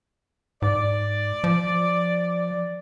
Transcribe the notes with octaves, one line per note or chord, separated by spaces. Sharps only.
G#2 D5
F3